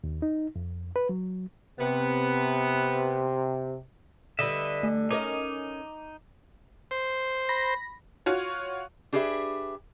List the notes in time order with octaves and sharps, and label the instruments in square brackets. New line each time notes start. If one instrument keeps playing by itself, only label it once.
[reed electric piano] D#2
D#4
F2
B4
F#3
[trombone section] C3 [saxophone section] B3
[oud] D3 G3 [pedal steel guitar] B4 D#5 E5
[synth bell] A3
[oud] C#4 A#4 D#5 [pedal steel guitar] D#4 [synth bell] D6
[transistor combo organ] C5
[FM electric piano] B5 A#6
[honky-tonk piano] F4 F#4 C#5
[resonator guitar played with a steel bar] D4 G4 G#4 B4 C5 E5